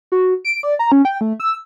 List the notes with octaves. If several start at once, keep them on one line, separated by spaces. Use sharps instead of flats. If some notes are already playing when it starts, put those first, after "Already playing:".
F#4
D7
D5
A#5
C#4
G5
A3
E6